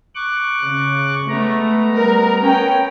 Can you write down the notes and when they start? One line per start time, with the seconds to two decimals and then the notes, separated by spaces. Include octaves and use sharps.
0.15 C#6 D6 F#6
0.63 C#3
1.29 G#3 A3 B3 A#5
1.95 G3 A#4
2.40 C#4 G5